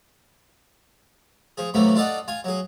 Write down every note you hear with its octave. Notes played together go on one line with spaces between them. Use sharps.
F3 G#4
A2 C3 E3 F#3 A3 A#3
D4 F4 A4 D5 D#5 F#5
F4 G#5
F#3 G#4